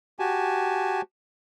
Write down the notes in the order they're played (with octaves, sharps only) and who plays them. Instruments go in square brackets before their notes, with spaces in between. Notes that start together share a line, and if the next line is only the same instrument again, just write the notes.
[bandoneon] F#4 G4 G#5 A5